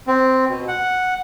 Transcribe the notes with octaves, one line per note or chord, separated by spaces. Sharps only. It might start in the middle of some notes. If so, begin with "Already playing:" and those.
C4
B2
F#5